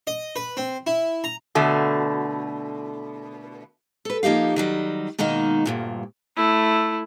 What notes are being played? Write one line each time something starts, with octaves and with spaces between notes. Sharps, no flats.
D#5
B4
C4
E4
A#5
B2 D3 A3
A4 B4
F3 A#3 D#4 G4 F5
D#3 F#3 G3
B2 D#3 G#3 A#3 D#4
D2 G2 A#2
A3 E4